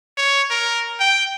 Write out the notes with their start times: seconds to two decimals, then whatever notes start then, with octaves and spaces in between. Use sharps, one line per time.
0.18 C#5
0.50 A#4
1.00 G5